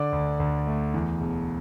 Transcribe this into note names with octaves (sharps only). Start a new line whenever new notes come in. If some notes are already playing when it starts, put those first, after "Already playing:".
Already playing: D3 D5 D6
D2
D2
A3
E2
E1